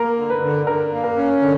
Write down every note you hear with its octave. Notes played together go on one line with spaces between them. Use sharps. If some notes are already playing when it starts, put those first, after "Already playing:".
Already playing: A#3 A#4
D3
B4
D3
D3 A#4
A#3
A#4
C#4
D3